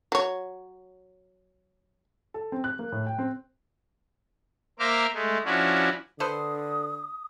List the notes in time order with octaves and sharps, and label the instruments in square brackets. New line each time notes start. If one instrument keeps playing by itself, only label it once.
[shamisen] F#3 C#5
[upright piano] A4
C4
F#6
A#3
A2
G5
C4
[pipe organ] A#3 A#4 C5 E5 D6 F6
G#3 A3
F3 C#4 D4 E4 F#4
[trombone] D3 [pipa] A4 B4 C5 [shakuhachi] D#6